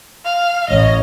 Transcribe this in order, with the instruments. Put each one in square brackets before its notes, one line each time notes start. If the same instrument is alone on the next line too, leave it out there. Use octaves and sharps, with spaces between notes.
[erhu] F5
[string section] A1 [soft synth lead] C#5 [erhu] D#5